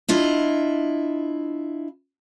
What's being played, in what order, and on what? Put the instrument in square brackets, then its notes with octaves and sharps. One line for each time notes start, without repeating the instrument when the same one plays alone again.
[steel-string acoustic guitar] D4 E4 F4 D#5